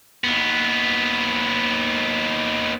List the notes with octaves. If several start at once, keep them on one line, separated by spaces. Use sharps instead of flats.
D#2 B3